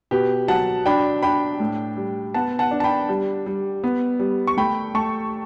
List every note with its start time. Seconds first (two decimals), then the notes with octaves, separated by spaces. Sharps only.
0.11 B2 G4 B4
0.48 F#3 F#5 A5
0.86 D4 G5 B5
1.22 D4 G5 B5
1.60 A2
1.97 G3
2.34 B3 F#5 A5
2.59 F#5 A5
2.71 D4
2.80 A5
2.84 G5 B5
3.09 G3
3.46 G3
3.84 B3
4.19 G3
4.47 C#6
4.57 A3 G5 B5
4.94 A3 A5 C#6